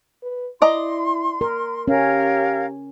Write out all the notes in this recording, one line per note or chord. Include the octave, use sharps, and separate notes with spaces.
B4
E4 D5 D#5 A#5 C6
A#4
C#4 G4 A#4 C#5 F5